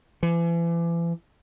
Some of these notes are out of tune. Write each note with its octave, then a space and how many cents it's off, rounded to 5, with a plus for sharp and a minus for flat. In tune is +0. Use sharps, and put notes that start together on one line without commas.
E3 +40